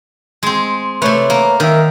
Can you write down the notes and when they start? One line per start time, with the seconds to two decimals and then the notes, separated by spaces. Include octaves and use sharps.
0.43 G#3 C4
1.02 C3 A3 B4 C#5
1.30 A#3
1.60 D#3 A#4 E5